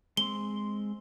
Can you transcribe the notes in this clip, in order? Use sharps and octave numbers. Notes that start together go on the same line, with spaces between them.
G#3 C4 C6 G7